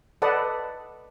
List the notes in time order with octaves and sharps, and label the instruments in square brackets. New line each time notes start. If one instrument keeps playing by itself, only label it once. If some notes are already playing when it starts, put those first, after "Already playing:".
[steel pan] A4 B4 D5 D#5 F#5 A5